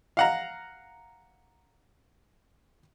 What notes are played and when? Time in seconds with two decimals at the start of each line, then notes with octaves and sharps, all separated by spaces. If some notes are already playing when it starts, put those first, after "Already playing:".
0.17 F5 F#5 A#5